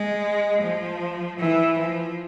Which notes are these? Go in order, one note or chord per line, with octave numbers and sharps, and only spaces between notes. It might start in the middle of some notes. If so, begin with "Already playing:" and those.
Already playing: G#3
F3
E3
F3